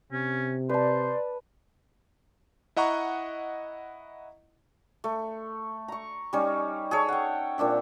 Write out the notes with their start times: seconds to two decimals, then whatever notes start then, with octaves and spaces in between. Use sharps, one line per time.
0.12 C3 C#4
0.69 B4 C5 D5 A5
2.76 E4 D#5 F#5 A#5 C#6
5.04 A3
5.88 A#5 C#6
6.33 G3 C#4 D#4
6.91 G#4 A4 C#5
7.08 F#5 G5
7.58 A#2 C4 D4 E5